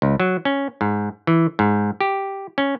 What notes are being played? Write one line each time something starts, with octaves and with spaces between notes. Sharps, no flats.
C#2
F#3
C#4
G#2
E3
G#2
G4
C#4